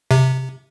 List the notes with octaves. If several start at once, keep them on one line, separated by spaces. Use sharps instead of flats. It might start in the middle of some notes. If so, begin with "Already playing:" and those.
C3